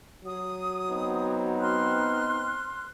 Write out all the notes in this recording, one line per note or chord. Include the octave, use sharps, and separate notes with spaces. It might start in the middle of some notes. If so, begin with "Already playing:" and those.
F#3 D#6
B3 C4 D#4
C6 F6 F#6